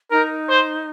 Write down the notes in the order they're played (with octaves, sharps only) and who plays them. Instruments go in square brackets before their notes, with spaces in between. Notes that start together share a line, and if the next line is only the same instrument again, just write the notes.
[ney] D#4 [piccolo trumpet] A#4
[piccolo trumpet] C5